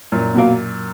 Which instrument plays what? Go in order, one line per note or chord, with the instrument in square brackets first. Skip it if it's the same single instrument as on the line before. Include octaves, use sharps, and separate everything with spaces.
[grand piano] F#2 A#2
[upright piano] B2 F#3 A#3